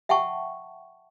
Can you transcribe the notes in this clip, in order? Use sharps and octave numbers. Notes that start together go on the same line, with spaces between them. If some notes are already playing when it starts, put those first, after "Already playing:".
E5 F#5 G5 A5 C#6